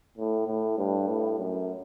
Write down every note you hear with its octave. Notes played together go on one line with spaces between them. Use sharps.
A2
A2
G2
A2
F#2